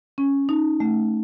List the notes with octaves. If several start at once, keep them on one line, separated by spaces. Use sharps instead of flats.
C#4
D#4
A3